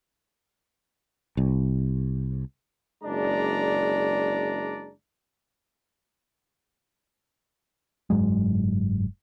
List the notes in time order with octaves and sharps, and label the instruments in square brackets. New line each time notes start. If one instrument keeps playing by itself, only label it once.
[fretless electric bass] C2
[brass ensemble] F#1 G#3 D4 D5 A#5
[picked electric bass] F#1 G#2 F#3 G#3